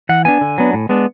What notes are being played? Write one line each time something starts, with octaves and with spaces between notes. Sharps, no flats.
E3 F#5
B3 D4 G#5
D3
F#3 B3 D4
A2
G#3 B3 D4